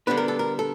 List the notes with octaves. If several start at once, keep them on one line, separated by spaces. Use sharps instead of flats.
D3 G3 B3 D4 B4
A#4
A4
A#4
A4